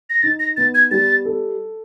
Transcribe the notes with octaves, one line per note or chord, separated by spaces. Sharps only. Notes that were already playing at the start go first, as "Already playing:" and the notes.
A#6
D#4 A6
A#6
B3 A6
G#6
G3 A6
A4